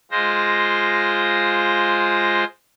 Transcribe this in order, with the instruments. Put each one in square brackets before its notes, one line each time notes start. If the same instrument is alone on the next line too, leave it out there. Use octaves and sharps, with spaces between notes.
[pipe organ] G#3 F4 C5 A#6